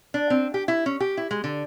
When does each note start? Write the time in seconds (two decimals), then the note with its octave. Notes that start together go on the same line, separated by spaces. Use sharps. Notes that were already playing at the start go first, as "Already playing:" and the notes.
0.14 D4
0.30 C4
0.54 G4
0.68 E4
0.86 C#4
1.00 G4
1.17 E4
1.31 G#3
1.44 D3